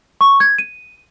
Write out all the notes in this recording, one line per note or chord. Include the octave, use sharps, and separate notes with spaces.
C#6
G#6
D#7